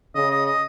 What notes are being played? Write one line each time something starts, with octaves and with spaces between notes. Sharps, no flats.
C#3 D#5
D#5
D#5